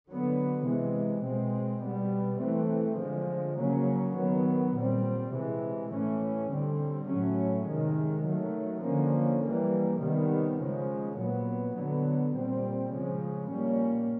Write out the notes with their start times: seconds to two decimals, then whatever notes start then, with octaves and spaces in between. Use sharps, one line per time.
0.09 D3 F#3 B3
0.67 C3 E3 G#3
1.26 B2 G#3 C4
1.85 B2 G3 B3
2.42 E3 A3 C4
3.01 D3 F3 G#3
3.60 C#3 F#3 A#3 C#4
4.17 D#3 F#3 B3
4.76 A#2 G3 C4
5.35 C3 E3 G#3
5.93 A2 E3 A3 C#4
6.51 D3 G3 C4
7.09 A2 F#3 A3 C#4
7.68 C3 D#3 G#3
8.26 D#3 F#3 A3
8.84 D3 F3 A#3 C#4
9.44 E3 G3 A#3
10.02 C3 D#3 G3 B3
10.59 C#3 F3 G#3
11.18 A#2 F#3 B3
11.76 D3 F#3 B3
12.35 A#2 G3 C4
12.93 C#3 F3 G#3
13.52 A#2 G3 A#3 C#4